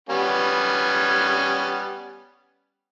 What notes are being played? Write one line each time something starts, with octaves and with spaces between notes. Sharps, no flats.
G3 B3 C#4